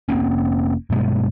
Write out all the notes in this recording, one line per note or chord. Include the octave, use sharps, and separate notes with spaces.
F1 A#3 C4 C#4
G2 B2 G#3